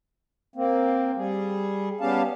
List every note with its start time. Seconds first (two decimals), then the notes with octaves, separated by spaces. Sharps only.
0.56 A#3 C4
1.16 G3 G#4
2.01 G3 B3 C#4 G4 F5 A5